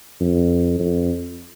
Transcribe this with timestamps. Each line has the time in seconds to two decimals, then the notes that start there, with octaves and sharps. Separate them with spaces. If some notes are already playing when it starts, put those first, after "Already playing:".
0.21 F2
0.79 F2